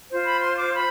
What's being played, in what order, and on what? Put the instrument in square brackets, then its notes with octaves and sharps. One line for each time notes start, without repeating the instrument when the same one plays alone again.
[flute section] F4 C5
B5
C6
D6
B5